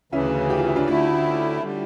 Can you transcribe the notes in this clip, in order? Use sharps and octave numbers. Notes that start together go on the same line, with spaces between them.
D2 C#3 E3 C#4 E4
G4
F4
E4
D4 F4
D2 D3 A3 D4 E4 F4
D3 G3